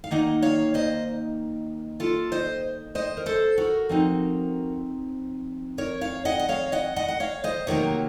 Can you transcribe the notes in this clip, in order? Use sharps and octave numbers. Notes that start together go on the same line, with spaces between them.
F5
D#3 A#3 D#4 D#5 F#5
C#5 F5
C5 D#5
F4 A4
C5 D#5
C5 D#5
A#4
A4 C5
F#4 A#4
F3 C4 D#4
A#4 C#5
C#5 F5
D#5 F#5
D#5
C#5 F5
D#5 F#5
D#5 F#5
F#5
C#5 F5
C5 D#5
C3 D#3 F#3 A#3 A#4 C#5